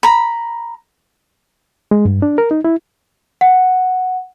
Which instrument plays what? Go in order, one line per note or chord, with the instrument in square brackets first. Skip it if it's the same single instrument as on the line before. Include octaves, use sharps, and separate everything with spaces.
[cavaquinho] A#5 B5
[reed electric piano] G#3
G2
D4
A#4
D#4
E4
[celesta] F#5